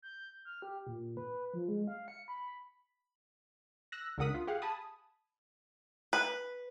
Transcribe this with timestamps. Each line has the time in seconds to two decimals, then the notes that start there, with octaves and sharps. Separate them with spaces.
0.02 G6
0.45 F6
0.62 G4
0.87 A#2
1.17 B4
1.54 F3
1.68 G#3
1.87 F5
2.08 C#7
2.28 B5
3.92 E6 F#6 A#6
4.18 C#2 D4 A#4 F#5 D#6 B6
4.34 F4
4.47 G4 G#4 F5 F#5
4.62 G#5 A5 B5 D#6
6.13 B4